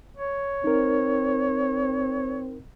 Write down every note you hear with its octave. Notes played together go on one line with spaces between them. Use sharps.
C#5
C4 D#4 A#4